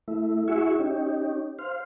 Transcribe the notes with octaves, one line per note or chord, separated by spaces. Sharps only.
A3 E4
E4 F#4 G#4 E5 C#6
C#4 D#4 G4
C5 F5